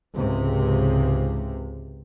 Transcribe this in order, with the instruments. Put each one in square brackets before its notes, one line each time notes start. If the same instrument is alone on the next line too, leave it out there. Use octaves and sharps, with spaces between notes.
[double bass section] C#2 G#2 C3